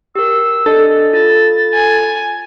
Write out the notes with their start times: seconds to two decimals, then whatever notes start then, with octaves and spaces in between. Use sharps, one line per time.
0.15 G4 A#4 E6
0.66 D4 A4 D#5
1.13 F4 A6
1.74 G#5